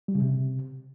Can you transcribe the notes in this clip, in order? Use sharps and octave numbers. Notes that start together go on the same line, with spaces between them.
G3
C#3
C3